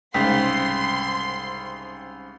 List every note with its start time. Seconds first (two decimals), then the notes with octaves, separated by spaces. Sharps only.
0.14 C2 G#2 C#3 G5 C6 B6